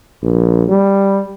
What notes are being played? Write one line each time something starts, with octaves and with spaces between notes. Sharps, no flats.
A#1
G3